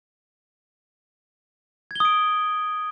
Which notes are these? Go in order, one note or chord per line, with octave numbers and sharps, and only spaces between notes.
D#6 G#6 D7 G7